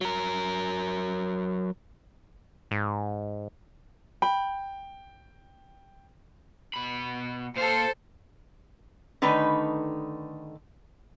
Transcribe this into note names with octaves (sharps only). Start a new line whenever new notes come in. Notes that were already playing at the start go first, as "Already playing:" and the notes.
F#3 A#4
G#2
G5 B5
B2 B5
A#2 A4 C5 F5
D3 D#3 A3 D#4 B4